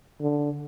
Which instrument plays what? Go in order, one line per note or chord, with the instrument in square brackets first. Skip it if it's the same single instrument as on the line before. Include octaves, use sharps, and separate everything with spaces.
[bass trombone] D3